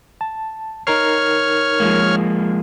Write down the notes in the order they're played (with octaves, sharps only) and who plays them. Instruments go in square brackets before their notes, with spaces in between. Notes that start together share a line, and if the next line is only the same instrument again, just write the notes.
[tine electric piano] A5
[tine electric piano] D#4 A#4 C7 [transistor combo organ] C#5 F6
[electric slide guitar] F3 G#3 A#3